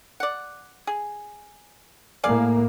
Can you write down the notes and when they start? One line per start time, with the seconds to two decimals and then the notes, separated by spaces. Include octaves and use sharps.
0.20 D5 F#5
0.87 G#4
2.24 A2 A#3 G#4 D5 F5